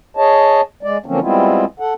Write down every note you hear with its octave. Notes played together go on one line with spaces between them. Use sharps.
G#4 C#5 D#5 A5
G#3 D5
D3 F3 F#3 A#3 C4 C#4
G3 G#3 B3 C4 E4 F4
A4 F#5